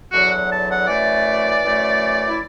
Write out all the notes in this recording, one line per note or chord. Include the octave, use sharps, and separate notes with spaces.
E2 D3 F#3 F#4
F#5
A5
F#5
F#2 E3 A3 D5
F#2 E3 A3
E4